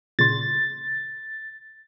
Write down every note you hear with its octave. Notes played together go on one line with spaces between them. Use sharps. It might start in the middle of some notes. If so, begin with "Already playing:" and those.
A#2 C#3 C6 A6